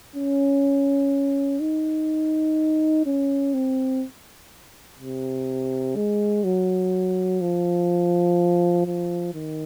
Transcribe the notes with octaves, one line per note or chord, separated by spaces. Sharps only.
C#4
D#4
C#4
C4
C3
G#3
F#3
F3
F3
D#3